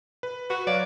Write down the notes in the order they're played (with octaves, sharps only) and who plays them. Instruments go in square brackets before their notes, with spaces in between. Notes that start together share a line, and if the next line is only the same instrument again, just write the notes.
[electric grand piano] B4
[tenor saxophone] F#4 [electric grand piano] B4
[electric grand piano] F#3 C#5 F5 [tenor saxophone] D5